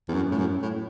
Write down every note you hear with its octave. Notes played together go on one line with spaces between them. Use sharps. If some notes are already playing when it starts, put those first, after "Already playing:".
E2
F#2
A2
F#2
A2